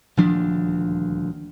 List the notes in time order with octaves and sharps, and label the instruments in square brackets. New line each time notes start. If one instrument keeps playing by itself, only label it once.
[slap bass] D#1 D2 F3 D4